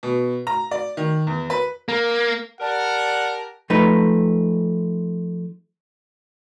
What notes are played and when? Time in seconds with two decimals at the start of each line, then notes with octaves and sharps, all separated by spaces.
0.03 B2
0.47 A#5
0.71 D5
0.97 D#3
1.27 E2
1.50 B4
1.89 A#3
2.61 G4 A#4 D5 F#5 A5
3.70 F3 A3 D#4 B4